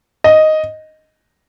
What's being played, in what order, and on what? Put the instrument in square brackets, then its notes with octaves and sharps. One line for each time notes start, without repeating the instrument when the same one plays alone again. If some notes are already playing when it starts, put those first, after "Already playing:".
[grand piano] D#5